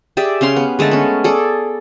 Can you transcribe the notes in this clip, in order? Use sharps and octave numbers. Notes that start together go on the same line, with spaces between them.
G4 G#4 D5 E5
C#3 C#4 F5 C6
B3
D3 G#3 A3 A5
B3 C#4
G#4 A4 D5